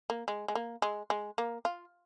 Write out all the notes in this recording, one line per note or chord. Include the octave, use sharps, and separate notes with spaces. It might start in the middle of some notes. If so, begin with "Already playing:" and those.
A#3
G#3
G#3
A#3
G#3
G#3
A#3
F4